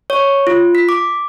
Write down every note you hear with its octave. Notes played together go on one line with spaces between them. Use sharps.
C#5
F4
B6
D6